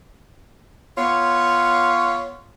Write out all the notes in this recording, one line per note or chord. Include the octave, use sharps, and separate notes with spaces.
B3 F4 C#5